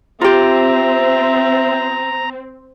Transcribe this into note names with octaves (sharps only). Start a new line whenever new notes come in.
C4 F4 G4 E5 A#5